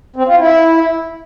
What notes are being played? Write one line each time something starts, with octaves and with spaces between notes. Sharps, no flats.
C4
F4
E4